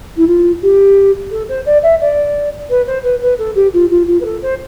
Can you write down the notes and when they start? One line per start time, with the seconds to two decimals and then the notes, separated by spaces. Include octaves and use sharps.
0.17 E4
0.27 F4
0.62 G4
1.31 A4
1.49 C5
1.66 D5
1.83 E5
2.01 D5
2.69 B4
2.86 C5
3.03 B4
3.21 B4
3.38 A4
3.55 G4
3.73 F4
3.90 F4
4.07 F4
4.20 B4
4.25 A4
4.42 C5